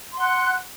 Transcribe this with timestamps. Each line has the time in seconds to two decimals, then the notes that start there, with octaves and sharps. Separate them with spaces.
0.13 C6
0.17 F#5
0.20 F#6